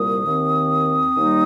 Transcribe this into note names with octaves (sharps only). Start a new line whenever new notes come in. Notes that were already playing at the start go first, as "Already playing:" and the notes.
Already playing: C2 A#2 G3 A#3 D#6
D#2 D#3 C4
D#2 D#3 G3 A#3 D#4